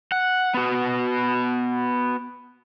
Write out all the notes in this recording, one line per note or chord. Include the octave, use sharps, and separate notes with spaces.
F#5
B3 F#4